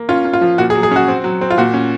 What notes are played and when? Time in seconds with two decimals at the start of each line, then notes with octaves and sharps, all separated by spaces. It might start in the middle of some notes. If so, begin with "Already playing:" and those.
Already playing: A#3
0.09 C#4 F4
0.25 C#4
0.33 F4
0.41 F3
0.58 A#2 F#4
0.70 G#4
0.75 F#3
0.83 G#4
0.91 C#4 F#4
1.08 C4
1.24 F#3
1.41 C4
1.50 F4
1.58 A#2 F#4
1.74 C#4